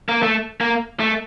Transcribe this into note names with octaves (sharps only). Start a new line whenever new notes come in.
A#3
A3
A#3
A3